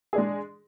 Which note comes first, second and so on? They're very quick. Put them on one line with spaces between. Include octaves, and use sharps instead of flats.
G#4 D4 G#3